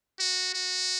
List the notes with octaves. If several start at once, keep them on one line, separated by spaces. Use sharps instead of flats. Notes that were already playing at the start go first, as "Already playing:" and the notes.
F#4
F#4